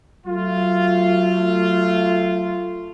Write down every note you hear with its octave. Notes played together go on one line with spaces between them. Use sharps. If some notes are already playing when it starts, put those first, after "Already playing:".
F#3 A3 F4